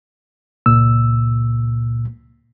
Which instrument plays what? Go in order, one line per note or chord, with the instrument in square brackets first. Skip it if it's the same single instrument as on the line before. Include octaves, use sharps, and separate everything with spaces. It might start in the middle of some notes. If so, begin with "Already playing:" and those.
[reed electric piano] C#2 A#2 E6